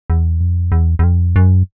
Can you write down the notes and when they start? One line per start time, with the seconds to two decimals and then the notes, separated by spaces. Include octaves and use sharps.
0.10 E2
0.41 F2
0.72 E2
0.99 E2
1.04 F2
1.36 F#2